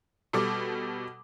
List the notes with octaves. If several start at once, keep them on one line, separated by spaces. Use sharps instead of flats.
B2 G3 A4 D6